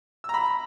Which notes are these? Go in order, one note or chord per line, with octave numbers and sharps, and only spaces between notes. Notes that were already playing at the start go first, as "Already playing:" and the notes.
A#5 B5 E6